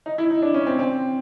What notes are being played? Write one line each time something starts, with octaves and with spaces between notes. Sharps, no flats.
D#4
E4
D#4
D4
C#4
C4
C4